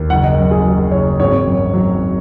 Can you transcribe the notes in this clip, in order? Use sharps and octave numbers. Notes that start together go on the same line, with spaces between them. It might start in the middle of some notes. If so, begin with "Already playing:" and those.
Already playing: D#2
F#1 F#5
D#5
F#2
G#4
F#3
F#1 C#5
G#1 C#5
F#2
F#3